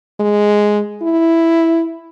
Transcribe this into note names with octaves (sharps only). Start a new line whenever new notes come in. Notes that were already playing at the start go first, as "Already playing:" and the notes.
G#3
E4